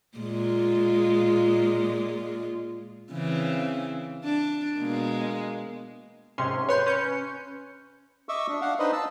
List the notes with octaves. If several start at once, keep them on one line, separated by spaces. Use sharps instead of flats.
A#2 G#3 F4
C#3 E3 C4
D4
B2 G#3 A#3
G#2 C3 C#4 C6
B4 C#5 C6 G6
C#4 G6 C#7
D#5 E5 C#6 D6 E6
D4
D4 F5 F#5
D4 D#4 B4 C5 D#5
A5 E6